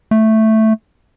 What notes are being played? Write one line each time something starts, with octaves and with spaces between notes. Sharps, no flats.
A3